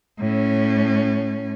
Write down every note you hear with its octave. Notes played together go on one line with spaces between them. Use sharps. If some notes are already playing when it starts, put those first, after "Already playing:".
A2 C#4